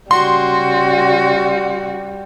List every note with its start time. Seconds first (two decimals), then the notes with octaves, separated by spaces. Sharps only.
0.11 C#3 G3 F#4 C6